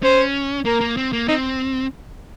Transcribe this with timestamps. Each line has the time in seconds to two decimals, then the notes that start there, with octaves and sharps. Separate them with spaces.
0.03 C#4 C5
0.65 A#3 A#4
0.81 A#3
0.97 C4
1.13 A#3
1.28 C4 D#4